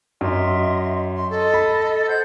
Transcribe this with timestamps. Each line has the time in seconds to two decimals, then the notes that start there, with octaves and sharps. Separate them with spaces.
0.21 F#2 D#5 E5 C6
1.16 C6
1.30 A4 D#5
1.54 B5
2.07 C5 F#5 G6